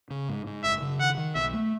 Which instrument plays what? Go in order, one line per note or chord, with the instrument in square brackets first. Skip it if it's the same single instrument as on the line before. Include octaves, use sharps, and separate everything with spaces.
[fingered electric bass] C#3
G#2
G#2
[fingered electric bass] F#1 [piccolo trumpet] E5
[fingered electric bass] C#3
[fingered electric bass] D#3 [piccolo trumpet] F#5
[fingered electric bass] D#3
[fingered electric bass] B1 [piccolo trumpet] E5
[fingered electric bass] A3